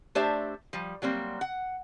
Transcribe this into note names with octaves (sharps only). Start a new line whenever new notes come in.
A3 D4 G4 C5 D5 E5
F3 G3
F#3 G3 A#3 C4
F#5